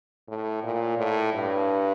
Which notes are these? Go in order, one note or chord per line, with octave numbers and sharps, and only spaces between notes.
A2
A#2
A2
G2